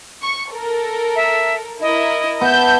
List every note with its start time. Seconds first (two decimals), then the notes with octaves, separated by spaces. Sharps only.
0.22 C#6
0.50 A4 A#4
1.16 E5
1.81 E4 A#4 D#5
2.41 B3 E5 A5 G6